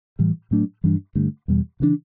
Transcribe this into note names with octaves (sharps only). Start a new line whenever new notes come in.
A2 E3 G3
A2 F#3 A3 D4
G2 E3 G3 D4
G2 D3 A3
E2 B2 G3
C#3 E3 G3 D4